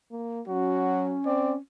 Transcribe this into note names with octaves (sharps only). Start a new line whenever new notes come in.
A#3
F#3 C#4 F#4
C4 D5